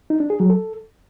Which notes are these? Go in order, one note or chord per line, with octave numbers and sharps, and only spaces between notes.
D#4
D4
G#4
F#3
A4